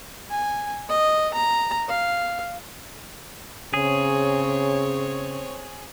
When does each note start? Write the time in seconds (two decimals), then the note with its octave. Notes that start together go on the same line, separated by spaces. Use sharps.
0.30 G#5
0.89 D#5
1.34 A#5
1.89 F5
3.74 C#3 C4 G#4 C#5